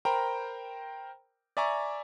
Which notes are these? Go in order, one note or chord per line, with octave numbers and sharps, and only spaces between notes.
A#4 C5 G5 A#5 B5
D5 E5 G#5 A#5 C#6 D6